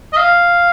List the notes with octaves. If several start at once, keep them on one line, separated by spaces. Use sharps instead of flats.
D#5
F5